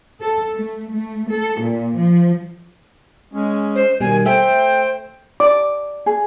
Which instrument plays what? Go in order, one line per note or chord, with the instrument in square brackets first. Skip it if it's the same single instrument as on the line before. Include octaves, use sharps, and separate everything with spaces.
[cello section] A4
A3
A3
A4
A#2
F3
[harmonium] G#3 C#4
[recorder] C5
[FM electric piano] B2 G3 [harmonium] D#3 [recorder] G#5
[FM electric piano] A3 E5 [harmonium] C5 [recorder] G5
[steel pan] D5 D6
[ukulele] G#4